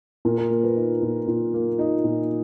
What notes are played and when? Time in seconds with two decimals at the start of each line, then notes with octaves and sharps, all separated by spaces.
0.25 A#2 A#4
0.38 A#4
0.50 A#3
0.64 B4
0.76 D#4
1.02 A#2
1.27 A#2
1.54 A#3
1.79 D#4 D#5
2.04 A#2